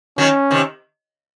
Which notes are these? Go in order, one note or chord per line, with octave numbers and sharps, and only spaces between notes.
D#3 F#3 C#4
C3 D#3